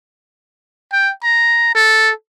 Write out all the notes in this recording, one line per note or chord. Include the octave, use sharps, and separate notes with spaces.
G5
A#5
A4